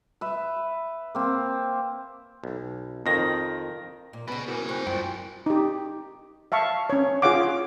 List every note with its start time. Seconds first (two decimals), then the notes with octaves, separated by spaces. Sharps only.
0.21 B4 E5
1.15 A#3 C4
2.44 B1
3.06 F2 D#3 A#4 A#6
4.13 A#2
4.28 C#3 B3 C#4 B4 D#5 B5
4.48 E4 F#4 A#4 C5 G#5
4.69 C4 C#6 F#6 G6
4.87 F#2 G3 E4 F4 G5
5.46 D#4 G4
6.52 E5 F5 A5 C#6
6.90 C#4 C#5
7.22 F4 G#4 C#5 F5 F#5 D6